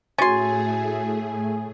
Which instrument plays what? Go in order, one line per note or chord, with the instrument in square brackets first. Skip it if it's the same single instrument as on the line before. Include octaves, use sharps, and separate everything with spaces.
[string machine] A2 A3 G#4 [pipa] C#4 C6 [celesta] F#4 A6 [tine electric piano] G#5